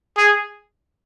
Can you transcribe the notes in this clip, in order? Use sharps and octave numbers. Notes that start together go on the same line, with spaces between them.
G#4